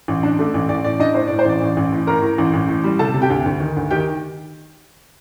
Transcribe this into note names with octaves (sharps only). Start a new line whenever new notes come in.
A1
D4
A3
A1
A1 D5
A2 D5
D4 D#4 D#5
A2 C5
D5
A2
C5
A1 D5
A1
A1
A2
A2 A#4 A#5
A2
A1
A1
A2
G3
C3 A4 A5
C3
G4 G5
D2
D2
D#3
D2
D#3 G4 G5